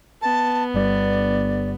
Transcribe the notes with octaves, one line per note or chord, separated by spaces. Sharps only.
B3 A5
G1 G3 D5